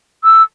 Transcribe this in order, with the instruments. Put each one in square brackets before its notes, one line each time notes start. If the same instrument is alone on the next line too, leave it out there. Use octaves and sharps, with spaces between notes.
[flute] E6